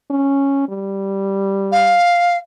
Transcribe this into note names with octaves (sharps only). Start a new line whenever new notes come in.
C#4
G3
F5